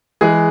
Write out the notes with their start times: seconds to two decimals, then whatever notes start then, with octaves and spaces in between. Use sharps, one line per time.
0.21 E3 G#3 G#4